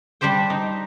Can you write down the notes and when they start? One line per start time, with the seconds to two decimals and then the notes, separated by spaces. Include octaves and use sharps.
0.21 G3 D4 G4 C5 G5
0.50 D#4